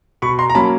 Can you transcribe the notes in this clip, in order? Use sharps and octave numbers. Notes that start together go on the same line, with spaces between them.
B2 B5 C#6
A#5 C6
A#5
F#3 A#3 C#4 A5 B5